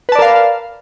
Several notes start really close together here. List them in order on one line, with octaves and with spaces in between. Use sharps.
B4 A5 D5 A#4 F5